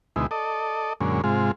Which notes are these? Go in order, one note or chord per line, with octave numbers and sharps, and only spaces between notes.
D2 B2 G#3 D#4 E4
A4 D5 D#5
F#2 A#2 D3 G#3 C#4
G#2 C3 G#3 F4